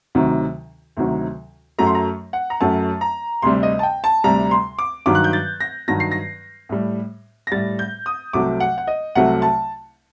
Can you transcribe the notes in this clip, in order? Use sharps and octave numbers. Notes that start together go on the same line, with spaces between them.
D2 C3 D#3 F#3
D2 C3 D#3 F#3
F#2 F#3 A3 A#5
C6
A#5
F#5
A#5
F#2 F#3 A3 A5
A#5
D2 C3 G3 C6
D#5
A5
G5
A5
D2 C3 G3 A#5
C6
D6
G2 D#3 F#3 D6
F#6
G6
A6
A#6
G2 D#3 F#3 A#6
C7
A#6
A2 G3
A#6
A2 G3 A6
G6
D#6
C2 C3 F#3 A3 D6
F#5
F#5
D#5
C2 C3 F#3 A3 F#5
A5